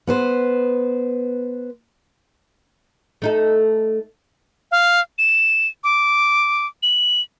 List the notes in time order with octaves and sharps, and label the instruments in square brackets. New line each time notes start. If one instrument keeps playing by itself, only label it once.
[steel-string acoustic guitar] B3 B4 C5
[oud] A3 D#4 A4
[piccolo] F5
E7
D6
F#7